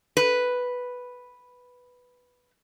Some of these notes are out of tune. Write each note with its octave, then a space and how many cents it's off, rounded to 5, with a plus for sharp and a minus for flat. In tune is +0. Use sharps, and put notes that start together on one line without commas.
B4 +0